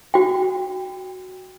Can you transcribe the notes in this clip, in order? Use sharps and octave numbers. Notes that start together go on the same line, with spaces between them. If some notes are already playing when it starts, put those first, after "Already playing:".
F#4 G5